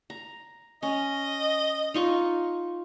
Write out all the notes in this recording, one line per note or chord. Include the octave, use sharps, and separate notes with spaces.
A#5
C#4 D#5
D#4 F4 C#6